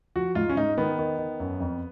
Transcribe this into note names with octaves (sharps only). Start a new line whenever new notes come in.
F3 F#4
G#2 F4
C#4
G#2 D#4
D#3 B3
D#3
D#3
F#2
F2